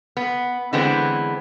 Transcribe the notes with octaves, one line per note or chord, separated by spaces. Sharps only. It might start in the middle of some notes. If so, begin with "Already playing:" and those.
B3
D3 E3 G#3 B3 C4